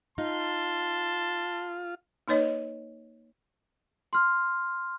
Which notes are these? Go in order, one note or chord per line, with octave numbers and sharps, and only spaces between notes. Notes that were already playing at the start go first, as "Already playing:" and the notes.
D#4 F4 A5 C6
A#3 D#4 B4 C#5 D#5
C6 F6